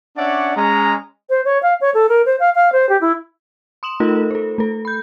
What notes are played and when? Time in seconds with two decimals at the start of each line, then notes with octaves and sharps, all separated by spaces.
0.17 C#4 D4 C#5 D5 E5 F#5
0.56 G#3 C#4 A#5
1.30 C5
1.45 C#5
1.63 F5
1.81 C#5
1.94 A4
2.09 A#4
2.26 C5
2.40 F5
2.55 F5
2.72 C5
2.89 G4
3.01 E4
3.83 C6 D#6 E7 F#7
4.00 A3 D#4 F4 A4 A#4 D#5
4.31 A4 C5
4.58 A3 A4
4.85 B5 G6